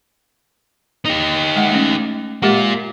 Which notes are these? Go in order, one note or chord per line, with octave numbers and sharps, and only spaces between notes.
D#4 G4
G#3 F#5
A3 C#4
G#3 A#3 F4 G4 F#5